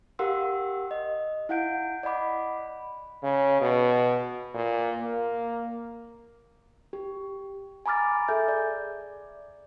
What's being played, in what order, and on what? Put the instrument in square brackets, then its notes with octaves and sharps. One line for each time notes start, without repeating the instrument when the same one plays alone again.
[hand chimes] G4 A#4 F5 F#5 C6 E6
D#5
E4 F5 F#5 G6 D7
D5 D#5 F#5 B5 D6
[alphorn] C#3
B2
A#2
A#3
[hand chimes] G4
G#5 A#5 B5 D6 F6 A6
G#4 A4 E5 G#5 G6
D5